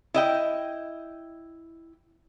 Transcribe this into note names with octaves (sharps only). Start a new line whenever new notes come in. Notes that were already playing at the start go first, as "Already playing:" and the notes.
E4 D#5 G5